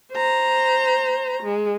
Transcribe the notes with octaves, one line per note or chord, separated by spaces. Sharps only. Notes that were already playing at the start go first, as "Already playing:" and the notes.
C5 A#5
G#3